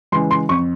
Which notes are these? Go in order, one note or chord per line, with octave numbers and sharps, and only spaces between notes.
C#3 E3 G#3 C6
C6
F2 C#6